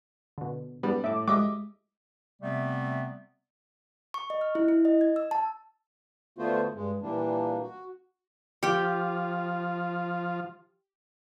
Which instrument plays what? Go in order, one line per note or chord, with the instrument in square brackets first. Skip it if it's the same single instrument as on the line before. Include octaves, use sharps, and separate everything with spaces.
[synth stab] B2 D3
[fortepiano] G3 [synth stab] B3 D4
[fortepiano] A2 [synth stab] E5 D6
[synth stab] G3 G#3 [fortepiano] D#5 E5 D6
[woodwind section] C3 G3 A3 B3 C4
[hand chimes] C#6
D#5
F6
E4
E4
D#5
G#6
E6
A5
[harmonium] D3 A3 B3 F4 F#4 C5
G2 G#3
A#2 E3 G3 A#3 D4
F#4
[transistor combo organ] F3 F4 [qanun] G4 G5